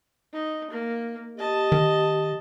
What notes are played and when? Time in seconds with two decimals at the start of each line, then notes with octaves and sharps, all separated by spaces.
0.33 D#4
0.70 A#3
1.38 G4 D#5 A5
1.72 D#3